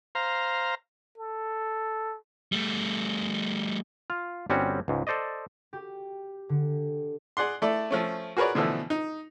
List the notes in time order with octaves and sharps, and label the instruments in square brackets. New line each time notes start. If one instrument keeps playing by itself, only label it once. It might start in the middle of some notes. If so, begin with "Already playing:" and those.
[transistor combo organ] C5 F5 A#5
[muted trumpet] A4
[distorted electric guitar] G3 A3
[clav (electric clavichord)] F4 F5
G1 G3 C4 C#4 F#4
C#2 G#2
A4 C5 D5 D#5
[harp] G4
D3
[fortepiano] G#4 D5 F#5 C6
A3 E4 A4 D5
F3 A3 C#4
F#4 G#4 A#4 B4 C#5 D5
B2 D3 E3 F3 A3
D#4